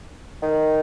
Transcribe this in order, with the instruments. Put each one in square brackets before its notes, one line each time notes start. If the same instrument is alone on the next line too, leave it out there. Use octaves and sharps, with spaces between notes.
[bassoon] D#3